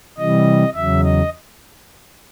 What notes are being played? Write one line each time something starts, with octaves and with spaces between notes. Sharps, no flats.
C3 E3 G3 D#5
E2 C#3 F#3 E5
D#5